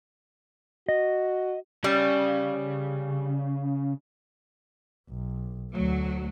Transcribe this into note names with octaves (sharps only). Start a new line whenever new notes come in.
F#4 D#5
C#3 G3
B1
D2 F#3 A3